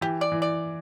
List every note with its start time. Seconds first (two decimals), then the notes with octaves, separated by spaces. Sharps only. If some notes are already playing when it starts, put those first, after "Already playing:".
0.01 E3 G4
0.21 D5
0.32 E3
0.42 D5